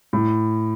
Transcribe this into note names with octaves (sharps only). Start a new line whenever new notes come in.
A2